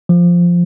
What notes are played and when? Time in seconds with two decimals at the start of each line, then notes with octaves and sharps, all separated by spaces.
0.09 F3